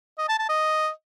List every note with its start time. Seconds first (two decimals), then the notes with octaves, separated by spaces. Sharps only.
0.18 D#5
0.29 A5
0.39 A5
0.49 D#5